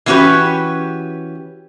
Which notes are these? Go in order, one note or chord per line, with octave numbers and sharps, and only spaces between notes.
E3 B3 C#4 F#4 G4 B4